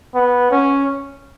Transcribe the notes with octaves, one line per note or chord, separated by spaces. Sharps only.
B3
C#4